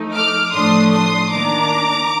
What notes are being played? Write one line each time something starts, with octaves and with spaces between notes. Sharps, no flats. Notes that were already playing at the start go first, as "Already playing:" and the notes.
Already playing: F3 A3 D#4
D6 F6
A2 F3 A3 D4 C6 D#6
C6 D#6
D#3 A#3 D4 A#5 D6